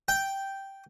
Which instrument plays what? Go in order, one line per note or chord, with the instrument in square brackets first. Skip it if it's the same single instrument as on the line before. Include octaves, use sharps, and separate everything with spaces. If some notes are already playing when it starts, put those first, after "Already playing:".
[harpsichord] G5